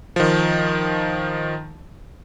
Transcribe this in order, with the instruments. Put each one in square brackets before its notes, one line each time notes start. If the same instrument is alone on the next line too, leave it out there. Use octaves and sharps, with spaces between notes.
[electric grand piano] D#3 F3